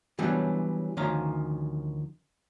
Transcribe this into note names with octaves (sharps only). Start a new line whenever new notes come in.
E3 F#3 G3 B3 C#4 D4
D2 D#3 F3 C#4 F5 A#5